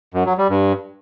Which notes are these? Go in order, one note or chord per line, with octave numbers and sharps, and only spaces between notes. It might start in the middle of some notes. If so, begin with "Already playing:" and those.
F#2
F#3
G3
G2